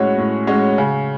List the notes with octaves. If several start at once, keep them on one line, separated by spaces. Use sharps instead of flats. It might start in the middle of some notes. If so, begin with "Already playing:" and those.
Already playing: A2 G#3 C#4 F#4 C#5
A2
G#3 C#4 F#4 C#5
C#3